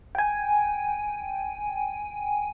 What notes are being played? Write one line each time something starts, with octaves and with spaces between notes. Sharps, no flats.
G5 G#5